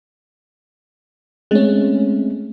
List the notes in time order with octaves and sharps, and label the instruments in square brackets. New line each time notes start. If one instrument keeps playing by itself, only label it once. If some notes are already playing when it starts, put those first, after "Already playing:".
[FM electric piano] G#3 C#4 [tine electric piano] A3 C4